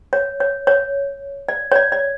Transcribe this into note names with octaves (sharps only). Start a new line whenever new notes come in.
C#5
C#5
C#5
D5
C#5
D5
D5